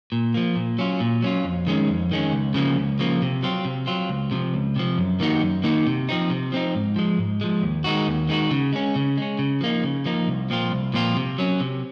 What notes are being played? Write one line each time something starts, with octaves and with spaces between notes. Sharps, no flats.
A#2
F3 A#3
A#2
F#3 C#4 F4
A#2
F#3 C#4 F4
F2
D#3 G#3 C#4
F2
D#3 G#3 C#4
C#2
C#3 F3 A#3
C#2
C#3 F3 A#3
C3
F#3 C4 F4
C3
F#3 C4 F4
C#2
C3 F3
C#2
C3 F3
F#2
D#3 A#3 D#4 F#4
F#2
D#3 A#3 D#4 F#4
C3
F3 C4 D#4
C3
F3 C4 D#4
G#2
F3 G#3
G#2
F3 G#3
D#2
D#3 G#3 D#4 F#4
D#2
D#3 G#3 D#4 F#4
C#3
G#3 C#4
C#3
G#3 C#4
C#3
F3 A#3 D#4
C#3
F3 A#3 D#4
C2
A#2 F3 C4 F4
C2
A#2 F3 C4 F4
C3
F#3 C#4
C3